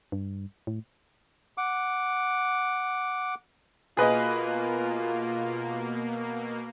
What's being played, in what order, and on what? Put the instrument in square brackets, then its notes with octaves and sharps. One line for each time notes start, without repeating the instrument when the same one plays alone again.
[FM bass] G2
A2
[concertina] F#5 D6
[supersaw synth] B2 A#3 [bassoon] F4 [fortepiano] G#4 B4 D#5